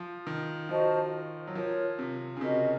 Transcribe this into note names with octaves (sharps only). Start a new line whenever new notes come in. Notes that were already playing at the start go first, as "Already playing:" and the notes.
Already playing: F3
D#3
F3 F#4 C5 D#5 A5
F#3
F3 F4 A#4 C#5
C3
C#3
C3 F#4 A#4 D#5